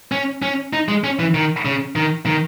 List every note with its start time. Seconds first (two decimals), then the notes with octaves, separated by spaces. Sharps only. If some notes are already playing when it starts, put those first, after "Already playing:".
0.12 C#4
0.42 C#4
0.73 D#4
0.89 G#3
1.04 C#4
1.19 E3
1.34 D#3
1.65 C#3
1.96 D#3
2.26 D#3